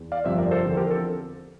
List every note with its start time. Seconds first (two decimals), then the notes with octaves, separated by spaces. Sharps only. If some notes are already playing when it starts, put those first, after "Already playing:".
Already playing: E2
0.12 D5 F5
0.24 G1 F2 C3 F3 C5 E5
0.37 A#4 D5
0.51 A4 C5
0.64 E2 D3 F3 C4
0.77 G4 A#4
0.91 A4